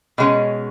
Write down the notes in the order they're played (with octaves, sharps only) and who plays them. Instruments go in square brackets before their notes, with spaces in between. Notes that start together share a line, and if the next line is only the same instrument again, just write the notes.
[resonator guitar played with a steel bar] B2 G#3 C#4